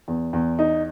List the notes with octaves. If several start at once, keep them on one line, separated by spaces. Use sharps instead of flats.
E2
E2
D#4